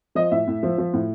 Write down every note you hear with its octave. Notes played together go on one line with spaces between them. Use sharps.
F3 D#5
A2 E5
A2
F3
F3
A2